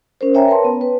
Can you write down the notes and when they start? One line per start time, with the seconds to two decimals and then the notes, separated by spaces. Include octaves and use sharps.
0.21 C#4 A#4 C5
0.34 C#5 E5 G5 G#5 A#5
0.48 A#4 B4 C#5 A5 C6
0.64 B3
0.81 B4